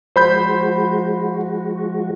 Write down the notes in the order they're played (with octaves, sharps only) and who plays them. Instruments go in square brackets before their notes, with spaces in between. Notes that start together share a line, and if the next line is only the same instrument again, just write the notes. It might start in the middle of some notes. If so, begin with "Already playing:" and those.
[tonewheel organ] F3 G#3 F#4 [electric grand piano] C5 B5 G6